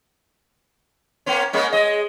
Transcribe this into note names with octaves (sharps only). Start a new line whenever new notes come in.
A#3 B3 C#4
G#3 A#3 C#4
G#3 D#5